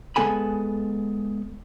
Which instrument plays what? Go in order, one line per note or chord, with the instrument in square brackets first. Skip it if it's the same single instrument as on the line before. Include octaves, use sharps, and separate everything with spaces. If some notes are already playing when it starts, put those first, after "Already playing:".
[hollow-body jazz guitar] G#3 B3 A4 G#5 B5